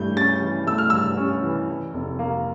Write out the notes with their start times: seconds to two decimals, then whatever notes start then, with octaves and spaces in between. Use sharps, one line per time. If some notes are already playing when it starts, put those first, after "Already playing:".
Already playing: G2 E3 A3 G6
0.16 C#4 A6
0.41 E3
0.67 A3 E6
0.78 F6
0.90 G2 E6
1.17 C#4
1.43 E3
1.69 E3
1.94 F1
2.19 A#3